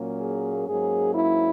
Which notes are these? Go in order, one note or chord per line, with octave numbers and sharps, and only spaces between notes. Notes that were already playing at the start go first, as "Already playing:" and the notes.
Already playing: A#2 F#3 A#3 C#4
G#4
G#2 F#3 A#3 C#4 G#4
E4